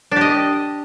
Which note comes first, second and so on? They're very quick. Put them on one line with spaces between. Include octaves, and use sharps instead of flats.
D4 G4 D#5